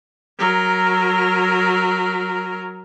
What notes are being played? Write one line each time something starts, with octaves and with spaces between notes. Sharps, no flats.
F#3 A#4